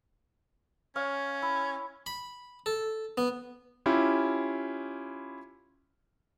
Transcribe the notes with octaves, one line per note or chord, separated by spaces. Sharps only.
C#4 C#5 F5
E4
B5
A4
B3
C#4 E4 F4 G4